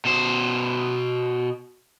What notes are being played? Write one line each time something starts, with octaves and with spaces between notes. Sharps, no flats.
B2 C5